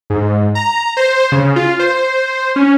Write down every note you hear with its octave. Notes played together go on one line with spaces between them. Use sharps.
G#2
A#5
C5
C#3
F4
C5
C#4